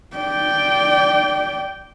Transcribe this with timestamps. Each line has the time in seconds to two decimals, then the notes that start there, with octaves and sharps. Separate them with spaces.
0.17 D5 G5